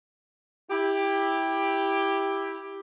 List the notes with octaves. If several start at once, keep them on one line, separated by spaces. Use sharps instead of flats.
E4 G4